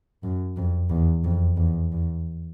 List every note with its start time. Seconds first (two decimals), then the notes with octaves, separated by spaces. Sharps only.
0.23 F#2
0.57 F2
0.90 E2
1.25 F2
1.57 E2
1.92 E2